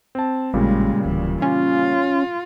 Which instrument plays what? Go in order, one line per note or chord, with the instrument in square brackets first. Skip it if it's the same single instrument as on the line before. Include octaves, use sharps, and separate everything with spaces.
[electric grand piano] C4 A5
[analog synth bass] A1 [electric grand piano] A#2 C#3 G3 [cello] G#3
[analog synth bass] D1 [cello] E3
[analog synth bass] C#4 [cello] F4